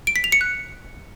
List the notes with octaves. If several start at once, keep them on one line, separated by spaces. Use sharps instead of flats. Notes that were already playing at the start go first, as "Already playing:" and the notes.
D7
B6
F7
C#7
F#6